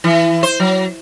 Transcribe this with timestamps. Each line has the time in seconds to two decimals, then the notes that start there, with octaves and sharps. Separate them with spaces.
0.04 E3
0.43 C5
0.60 F#3